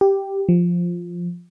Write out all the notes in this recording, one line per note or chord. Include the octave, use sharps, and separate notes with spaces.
G4
F3